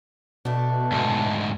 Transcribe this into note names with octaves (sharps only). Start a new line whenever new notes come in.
B2 A3 D4
D2 G#2